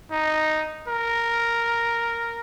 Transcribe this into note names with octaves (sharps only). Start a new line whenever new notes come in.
D#4
A#4